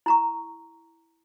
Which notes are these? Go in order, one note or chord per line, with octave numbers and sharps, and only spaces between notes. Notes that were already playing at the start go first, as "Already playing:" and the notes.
E4 A#5 C#6